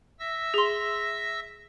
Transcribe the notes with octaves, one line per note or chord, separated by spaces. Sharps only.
E5 E6 A#6
G#4 C6